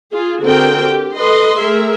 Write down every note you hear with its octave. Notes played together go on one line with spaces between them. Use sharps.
F4 G#4
D3 C4 F#4 G#4 A#4 G5
G4
A4 B4 D#5 C6
A3 G#4 A#4 E5